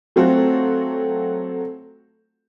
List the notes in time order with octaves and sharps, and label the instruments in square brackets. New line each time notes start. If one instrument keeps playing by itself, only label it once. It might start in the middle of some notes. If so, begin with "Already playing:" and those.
[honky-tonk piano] F#3 A3 C4 F4 F#4 A4